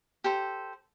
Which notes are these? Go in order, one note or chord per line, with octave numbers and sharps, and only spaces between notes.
G4 A4 C5